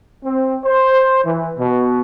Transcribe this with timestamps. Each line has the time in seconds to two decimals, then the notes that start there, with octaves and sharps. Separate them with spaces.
0.25 C4
0.65 C5
1.25 E3
1.58 B2